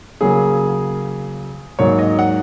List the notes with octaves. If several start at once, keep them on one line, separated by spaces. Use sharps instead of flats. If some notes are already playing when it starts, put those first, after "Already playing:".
C#3 F#3 A#3 G#4
G#2 F#3 A#3 C#5
D#5
F#5